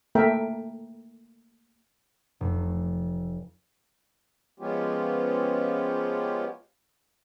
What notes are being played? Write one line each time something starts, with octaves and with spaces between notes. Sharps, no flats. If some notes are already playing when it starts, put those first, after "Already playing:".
A3 A#3 A4 A#4 E5 G5
F1
F3 G#3 B3 C#4 F4 G4